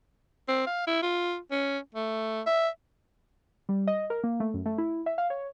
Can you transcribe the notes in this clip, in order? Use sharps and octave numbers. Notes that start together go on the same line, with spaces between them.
C4
F5
E4
F4
C#4
A3
E5
G3
D#5
A#4
A#3
A3
F#2
A3
E4
E5
F5
C#5